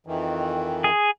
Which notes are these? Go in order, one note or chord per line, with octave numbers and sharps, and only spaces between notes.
F2 D#3 E3
G#4